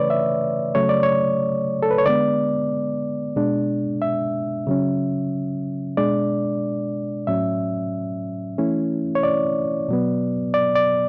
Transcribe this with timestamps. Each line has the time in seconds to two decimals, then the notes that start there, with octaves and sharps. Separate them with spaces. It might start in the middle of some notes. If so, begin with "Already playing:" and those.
Already playing: C#3 E3 A3 B4 C#5 D5
0.10 E5
0.75 C#3 F#3 A3 C#5
0.89 D5
1.03 C#5
1.83 A4
1.91 B4
1.98 C#5
2.06 D3 G#3 B3 D5
3.36 B2 G#3 D4
4.02 E5
4.67 C#3 F#3 C#4
5.97 B2 G#3 D4 D5
7.27 A2 F#3 C#4 E5
8.58 E3 A3 C#4 E4
9.15 C#5
9.23 D5
9.89 B2 F#3 B3
10.54 D5
10.76 D5